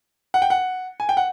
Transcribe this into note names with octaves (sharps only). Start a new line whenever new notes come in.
F#5
G5
F#5
G#5
G5
F#5